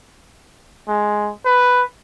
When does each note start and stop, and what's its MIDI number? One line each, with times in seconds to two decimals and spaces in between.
0.88 1.31 56
1.45 1.83 71